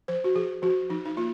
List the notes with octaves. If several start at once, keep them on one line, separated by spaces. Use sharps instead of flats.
F3 C5
F#4
F3 G#4
F3 F#4
F3 D#4
D#4
A#3 F4